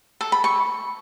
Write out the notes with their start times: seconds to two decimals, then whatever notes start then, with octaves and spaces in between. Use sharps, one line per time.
0.21 A4
0.32 B5
0.44 C#6